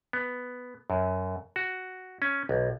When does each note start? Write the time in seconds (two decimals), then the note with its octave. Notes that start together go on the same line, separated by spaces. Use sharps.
0.13 B3
0.90 F#2
1.56 F#4
2.22 C#4
2.49 B1